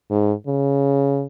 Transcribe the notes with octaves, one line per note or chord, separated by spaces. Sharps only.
G#2
C#3